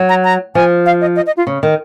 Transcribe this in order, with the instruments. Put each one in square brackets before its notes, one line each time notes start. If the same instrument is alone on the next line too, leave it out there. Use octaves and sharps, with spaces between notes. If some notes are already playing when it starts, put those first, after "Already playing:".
Already playing: [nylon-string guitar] F#3
[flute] A#5
A#5
[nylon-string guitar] F3 [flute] G#5
[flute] F5
D#5
D#5
D#5
F4
[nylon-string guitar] C#3
D#3